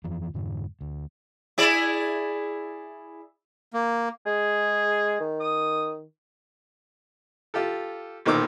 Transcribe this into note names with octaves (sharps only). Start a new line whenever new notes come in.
F2 E3 F3
F2 G#2 D3
D2
E4 G#4 D5
A#3
G#3 G#4
D#3
D#6
F4 G4 A4
B1 A#2 D#3 C5 D6 E6